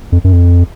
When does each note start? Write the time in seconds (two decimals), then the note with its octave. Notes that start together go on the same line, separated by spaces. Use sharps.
0.12 F2
0.24 F#2
0.33 F2